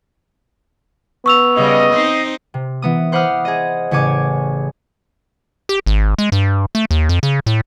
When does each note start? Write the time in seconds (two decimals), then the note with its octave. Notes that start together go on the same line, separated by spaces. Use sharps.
1.26 B3 C#6 E6 F7
1.55 C#3 G3 C#4 D#5
1.93 C4 D#4 C5
2.54 C3
2.82 E3 B3 D#6
3.12 C5 F#5 B5 D6 D#6 F6
3.45 G#4 D#5
3.91 A1 C#3 C#5 G#5 D6
5.69 G4
5.86 G#1
6.18 G#3
6.32 G2
6.75 A3
6.91 D#2
7.09 F2
7.23 C#3
7.46 A2